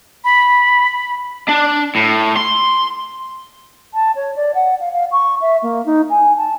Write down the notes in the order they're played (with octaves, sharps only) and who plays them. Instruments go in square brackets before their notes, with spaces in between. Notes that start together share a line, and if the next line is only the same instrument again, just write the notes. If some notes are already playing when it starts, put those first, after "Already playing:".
[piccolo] B5
[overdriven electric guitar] D4
A2
C6
[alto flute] A5
C#5
D5
F#5
F5
F5
C#6
E5
A#3
D#4
G#5
A5